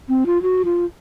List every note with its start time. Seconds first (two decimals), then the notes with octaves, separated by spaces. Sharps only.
0.09 C4
0.26 F4
0.42 F#4
0.65 F4